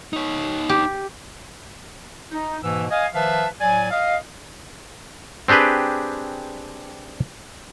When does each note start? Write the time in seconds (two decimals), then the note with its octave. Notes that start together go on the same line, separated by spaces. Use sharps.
0.13 D#4 C#5
0.69 G4
2.31 D#4
2.64 G#2 B2 E3 A#3 E6
2.91 D#5 F5 G#5
3.14 D#3 F3 B4 E5 F5 A5
3.60 A2 F#3 D5 G#5
3.91 D#5 F5
5.48 C4 D4 G4 G#4 B4